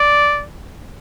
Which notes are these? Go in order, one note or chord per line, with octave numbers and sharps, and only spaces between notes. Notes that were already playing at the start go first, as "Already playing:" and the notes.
Already playing: D5